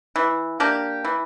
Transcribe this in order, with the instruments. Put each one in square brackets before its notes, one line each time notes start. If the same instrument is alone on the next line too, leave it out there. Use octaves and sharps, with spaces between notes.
[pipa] E3
A#3 D4 G4
E3